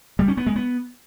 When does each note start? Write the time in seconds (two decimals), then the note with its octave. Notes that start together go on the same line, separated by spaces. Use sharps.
0.19 G3
0.28 C#4
0.37 B3
0.47 G#3
0.56 B3